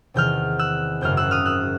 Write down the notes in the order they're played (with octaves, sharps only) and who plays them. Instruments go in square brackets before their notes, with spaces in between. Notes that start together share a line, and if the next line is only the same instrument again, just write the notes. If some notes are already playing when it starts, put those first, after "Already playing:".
[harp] E2 C3 D#3 F6 G6
E6 F#6
G#1 F#2 C#3 F6 G6
E6 F#6
D#6 F6
E6 F#6